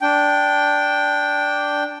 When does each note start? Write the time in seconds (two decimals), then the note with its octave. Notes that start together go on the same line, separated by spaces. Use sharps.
0.01 D4 G5